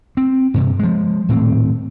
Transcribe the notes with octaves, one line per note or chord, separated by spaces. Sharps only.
C4
G2 C3
F3 G#3
D#1 A2 C4